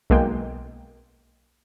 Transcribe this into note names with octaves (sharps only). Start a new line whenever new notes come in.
B1 G#3 A#3 G5